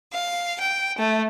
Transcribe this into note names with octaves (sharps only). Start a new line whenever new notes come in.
F5
G5
A3